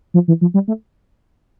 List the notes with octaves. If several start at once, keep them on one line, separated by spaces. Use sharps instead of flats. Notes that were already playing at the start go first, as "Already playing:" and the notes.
F3
E3
F3
G3
A3